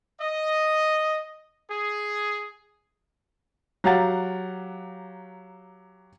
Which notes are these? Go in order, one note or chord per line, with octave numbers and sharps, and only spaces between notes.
D#5
G#4
F#3 G4 F5 F#5 A#5 A6